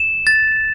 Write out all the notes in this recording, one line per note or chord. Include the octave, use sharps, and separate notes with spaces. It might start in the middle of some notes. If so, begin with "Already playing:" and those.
Already playing: E7
A6